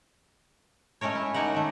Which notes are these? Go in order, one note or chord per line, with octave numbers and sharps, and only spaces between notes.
G#3 A3 C#4 A#4 C#5
E4
A3 A#3 D#4 A#4 D#5 F#5
D#3 A3